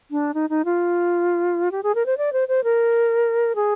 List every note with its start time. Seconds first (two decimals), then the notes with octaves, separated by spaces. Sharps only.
0.11 D4
0.34 D#4
0.50 D#4
0.65 F4
1.72 G4
1.83 G#4
1.95 A#4
2.06 C5
2.18 D5
2.33 C5
2.48 C5
2.64 A#4
3.55 G#4